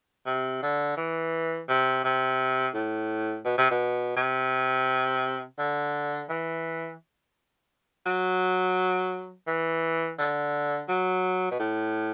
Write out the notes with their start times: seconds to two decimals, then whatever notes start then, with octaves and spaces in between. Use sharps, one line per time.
0.26 C3
0.63 D3
0.97 E3
1.69 C3
2.04 C3
2.74 A2
3.45 B2
3.58 C3
3.71 B2
4.16 C3
5.58 D3
6.29 E3
8.06 F#3
9.47 E3
10.18 D3
10.88 F#3
11.51 B2
11.59 A2